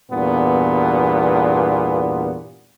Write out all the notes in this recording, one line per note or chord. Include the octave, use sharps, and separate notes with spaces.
E2 G2 A#2 B3